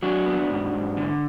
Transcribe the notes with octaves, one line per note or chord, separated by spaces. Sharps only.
F#3 D4 F#4
B3
G#2
G#2
D3